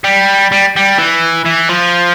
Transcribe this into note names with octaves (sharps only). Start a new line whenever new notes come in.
G3
G3
G3
E3
E3
F3